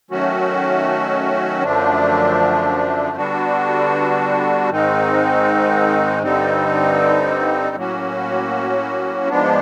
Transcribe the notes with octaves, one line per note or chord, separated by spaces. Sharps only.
D#3 F#3 A3 C#4 F#4
F#2 D3 F3 A3 D4
D3 G3 B3 D4 F#4
G#2 D#3 G#3 C4 D#4
G2 D3 G3 C4 D#4
A2 F#3 A#3 C#4 F#4
G#2 F3 G#3 B3 D4